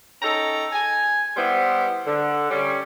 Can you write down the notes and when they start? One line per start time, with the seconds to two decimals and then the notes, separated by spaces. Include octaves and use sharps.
0.22 C#4 D#4 A4 G5 A#5
0.73 G#5
1.37 G3 B3 E4 C5
2.06 D3
2.50 G3 C#4